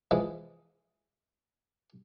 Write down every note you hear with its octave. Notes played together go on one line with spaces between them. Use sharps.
E3 F3 G#3